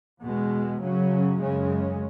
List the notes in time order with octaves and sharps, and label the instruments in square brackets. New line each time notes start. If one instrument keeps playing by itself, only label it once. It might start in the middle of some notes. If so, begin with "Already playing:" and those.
[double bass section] E2 B2 G#3
F#2 C#3 F#3 C#4
F#2 C#3 G#3 C#4